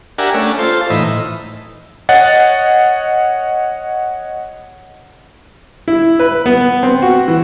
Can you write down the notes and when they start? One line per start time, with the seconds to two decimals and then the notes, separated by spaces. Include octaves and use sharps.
0.18 D4 G4 A#4 E5 F#5 G#5
0.34 A3 C#4 D4
0.59 F4 A4 C5
0.90 A2 E3 D#4 E5 B5
2.09 C#5 D#5 F#5 A6
5.88 E4
6.20 B4
6.46 B3
6.83 C4
7.02 F#4
7.28 E3